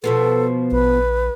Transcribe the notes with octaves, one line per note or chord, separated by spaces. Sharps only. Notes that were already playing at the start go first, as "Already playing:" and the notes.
B2 F3 B3 A4
A#1 B4